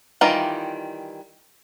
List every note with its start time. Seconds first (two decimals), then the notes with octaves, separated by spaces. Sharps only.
0.21 D#3 E3 G3 F4 A#5